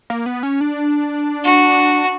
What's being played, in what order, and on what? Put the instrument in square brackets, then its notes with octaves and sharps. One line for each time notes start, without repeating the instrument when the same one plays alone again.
[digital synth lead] A#3
B3
C#4
D4
[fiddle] F#4